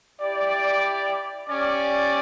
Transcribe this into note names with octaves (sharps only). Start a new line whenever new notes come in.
E4 G4 D5
C#4 G4 D5